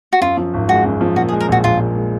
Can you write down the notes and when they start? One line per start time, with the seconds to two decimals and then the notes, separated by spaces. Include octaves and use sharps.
0.13 F#4
0.21 F#2 F4
0.37 F3
0.54 G#1
0.68 G#3 F#4
0.84 F#2
1.01 F3
1.16 A#2 F#4
1.29 G#4
1.32 G#3
1.40 A#4
1.49 A#1 F#4
1.64 A#1 F4
1.79 A#2
1.96 G#3